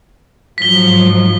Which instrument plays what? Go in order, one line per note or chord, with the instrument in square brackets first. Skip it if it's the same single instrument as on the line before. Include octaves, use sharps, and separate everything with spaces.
[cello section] G#2 F3 F#3 [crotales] B6 G7